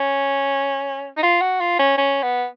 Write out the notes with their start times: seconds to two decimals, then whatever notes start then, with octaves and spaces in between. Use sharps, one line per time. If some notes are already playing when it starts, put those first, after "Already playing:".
Already playing: C#4
1.17 D#4
1.23 F4
1.42 F#4
1.61 F4
1.79 C#4
1.98 C#4
2.23 B3